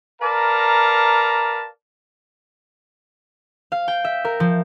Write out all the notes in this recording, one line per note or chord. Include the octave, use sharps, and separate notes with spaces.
A#4 B4 D5 F5 A5 A#5
F5
G5
E5
A#4
F3